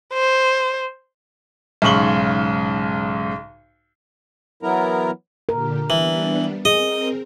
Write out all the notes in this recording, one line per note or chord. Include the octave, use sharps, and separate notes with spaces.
C5
B1 G#2 C#3 C#6 F#7 G7
E3 F#3 B3 E4 A#4 A#5
A#2 D3 G4 A#4
E3 G3 B3 D4
C4 G#4 A#4 D#5